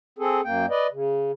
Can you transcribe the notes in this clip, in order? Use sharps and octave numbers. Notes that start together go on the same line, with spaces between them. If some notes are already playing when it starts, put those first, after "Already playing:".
C4 G#4 A4
F#2 A#3 G5
B4 D5 D#5
C#3